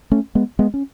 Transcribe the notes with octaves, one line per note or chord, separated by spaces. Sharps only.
A3 C#4
G#3 B3
G#3 B3
C#4